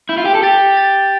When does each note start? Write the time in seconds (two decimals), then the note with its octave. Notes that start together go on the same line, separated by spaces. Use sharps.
0.09 E4 G6
0.17 F4
0.25 G4
0.34 A4
0.43 G4 A6
0.77 A6